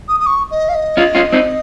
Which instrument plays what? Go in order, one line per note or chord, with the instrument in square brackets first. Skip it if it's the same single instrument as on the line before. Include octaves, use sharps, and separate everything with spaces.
[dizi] D#6
D#6
C#6
D#5
F5
D#5
[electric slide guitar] C#4 F4
C#4 F4
C4 D#4